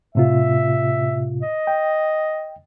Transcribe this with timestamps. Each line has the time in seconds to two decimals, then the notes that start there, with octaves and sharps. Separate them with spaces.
0.15 A2 C3 F4 E5
1.43 D#5
1.67 G5